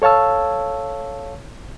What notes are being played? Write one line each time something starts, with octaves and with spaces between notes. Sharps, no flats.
A4 C#5 F5 A5 E6